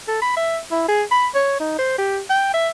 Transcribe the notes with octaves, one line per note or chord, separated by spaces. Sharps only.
A4
B5
E5
E4
G#4
B5
C#5
D#4
C5
G4
G5
E5